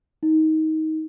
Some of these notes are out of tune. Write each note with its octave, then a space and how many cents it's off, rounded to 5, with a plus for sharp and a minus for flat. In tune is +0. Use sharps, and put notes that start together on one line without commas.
D#4 +20